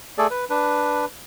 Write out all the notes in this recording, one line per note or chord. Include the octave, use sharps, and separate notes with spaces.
A3 G#4 A4 D5
B4
D4 B4